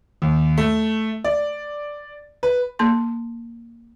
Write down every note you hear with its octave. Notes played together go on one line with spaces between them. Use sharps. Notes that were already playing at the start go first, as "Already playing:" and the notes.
D#2
A3
D5
B4
A#3 A5 C6